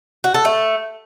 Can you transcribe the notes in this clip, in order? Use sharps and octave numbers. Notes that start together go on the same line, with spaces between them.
F#4
A4
A3